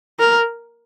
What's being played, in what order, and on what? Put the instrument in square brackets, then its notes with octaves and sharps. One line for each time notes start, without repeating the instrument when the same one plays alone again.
[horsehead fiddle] A#4